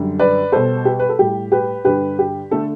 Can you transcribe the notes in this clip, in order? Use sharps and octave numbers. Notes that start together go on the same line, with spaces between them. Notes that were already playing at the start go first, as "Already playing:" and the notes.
Already playing: F#2 D3 G3
B4 D5
B2 G3 A4 C5
G4 B4
B4
A4
A2 G3 G4
G4 B4
G2 D3 G3 G4 B4
G4
D3 A3 A4